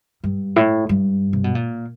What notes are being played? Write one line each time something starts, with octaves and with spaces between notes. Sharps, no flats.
G2
A2
G2
C3
B2
A#2